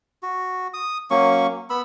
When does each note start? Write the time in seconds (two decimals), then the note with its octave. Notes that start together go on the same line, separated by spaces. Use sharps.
0.23 F#4
0.74 D#6
1.11 F#3 A#3 C#4 C#6
1.70 B3 B5 E6